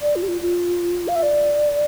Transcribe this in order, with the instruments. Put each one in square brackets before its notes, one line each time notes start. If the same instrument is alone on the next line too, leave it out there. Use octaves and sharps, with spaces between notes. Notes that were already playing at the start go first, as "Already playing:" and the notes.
[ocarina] D5
F4
G4
F4
F4
F5
E5
D5